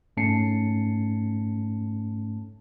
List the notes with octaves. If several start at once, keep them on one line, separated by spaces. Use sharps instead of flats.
G#2 A3 C#4 A5 C7 C#7